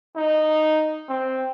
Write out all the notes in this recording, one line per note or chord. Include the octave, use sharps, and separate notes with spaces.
D#4
C4